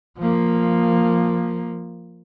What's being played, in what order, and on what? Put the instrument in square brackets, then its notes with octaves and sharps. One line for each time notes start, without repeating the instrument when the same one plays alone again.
[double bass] F3 A#3